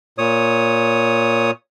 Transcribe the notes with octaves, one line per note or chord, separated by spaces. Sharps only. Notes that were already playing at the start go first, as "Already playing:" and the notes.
A#2 C#5 D#6